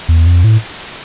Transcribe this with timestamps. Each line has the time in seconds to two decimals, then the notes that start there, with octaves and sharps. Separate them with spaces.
0.09 E2
0.26 F2
0.44 A2